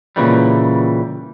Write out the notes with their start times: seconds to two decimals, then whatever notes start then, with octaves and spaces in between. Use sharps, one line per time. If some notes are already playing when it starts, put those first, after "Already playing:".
0.16 A#2 C#3 E3 G3